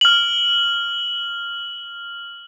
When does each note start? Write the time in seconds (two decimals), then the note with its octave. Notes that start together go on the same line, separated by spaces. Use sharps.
0.01 F6 F#7